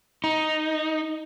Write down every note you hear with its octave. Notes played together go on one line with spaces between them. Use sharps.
D#4